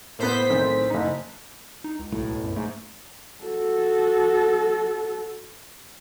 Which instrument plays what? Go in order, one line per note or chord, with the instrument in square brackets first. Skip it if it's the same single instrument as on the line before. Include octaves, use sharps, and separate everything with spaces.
[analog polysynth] A2 C5 B6 [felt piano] A#3 B3
[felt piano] B1 D#3 C4
F#1 D#4
[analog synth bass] D#4
C#2
[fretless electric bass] B1 A2
[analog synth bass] F#2
[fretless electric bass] G#2 [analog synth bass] A3
[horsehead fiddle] F#4 A4